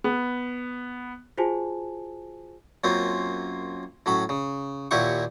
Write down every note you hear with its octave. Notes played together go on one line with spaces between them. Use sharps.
B3
F4 F#4 G#4 C5 G#5 A5
F#2 A#3 C4 C#4 F4
A2 F#3 C#4 B5
C#3
D#2 A#2 E4 G4 F#5 C#6